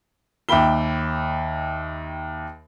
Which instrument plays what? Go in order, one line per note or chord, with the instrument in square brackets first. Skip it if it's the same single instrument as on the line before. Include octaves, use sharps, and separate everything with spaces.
[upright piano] D#2 E5 G5 B5 G7